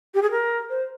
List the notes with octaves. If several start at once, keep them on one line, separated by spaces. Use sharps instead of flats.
G4
G#4
A#4
C5